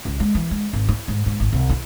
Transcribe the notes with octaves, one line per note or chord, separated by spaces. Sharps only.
C#2
G#3
E3
G#3
G#1
E4
G#2
G#2
G#1
C2
E4